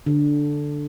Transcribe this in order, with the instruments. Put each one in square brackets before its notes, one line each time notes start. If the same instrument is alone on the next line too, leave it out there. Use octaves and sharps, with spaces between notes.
[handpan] D3